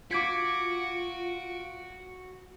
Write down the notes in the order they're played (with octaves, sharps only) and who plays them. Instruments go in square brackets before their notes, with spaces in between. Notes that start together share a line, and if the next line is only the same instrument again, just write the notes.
[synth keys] F4 D7 [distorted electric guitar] F#4 [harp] D6 G#6 B6